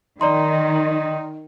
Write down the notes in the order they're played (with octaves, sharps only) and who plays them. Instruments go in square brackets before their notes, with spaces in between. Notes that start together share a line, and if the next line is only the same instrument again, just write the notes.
[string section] D#3 [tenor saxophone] D#4 [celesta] D5 A#5 C6